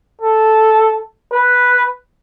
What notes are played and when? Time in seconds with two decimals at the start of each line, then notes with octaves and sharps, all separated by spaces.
0.21 A4
1.33 B4